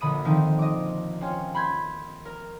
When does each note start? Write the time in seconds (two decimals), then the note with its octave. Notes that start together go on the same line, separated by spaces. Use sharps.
0.01 A#1 D3 B5 D#6 D#7
0.25 D3 D#3 F3 C4 D#4
0.59 D#5 D6
1.21 C4 C#4 F4
1.54 B5 C6 G6 G#6
2.25 A#4